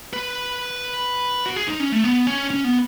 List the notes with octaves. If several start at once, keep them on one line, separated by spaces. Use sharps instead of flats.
B4
F#4
G#4
D#4
C#4
A3
B3
C#4
C#4
B3